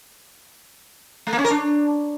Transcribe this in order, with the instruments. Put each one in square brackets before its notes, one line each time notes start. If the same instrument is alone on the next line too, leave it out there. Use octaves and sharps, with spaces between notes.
[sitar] A3
A#3
C#4
A#4
D4